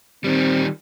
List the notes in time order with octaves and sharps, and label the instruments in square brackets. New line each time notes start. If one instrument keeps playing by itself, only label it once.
[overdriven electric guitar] D#3 G3 [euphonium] C4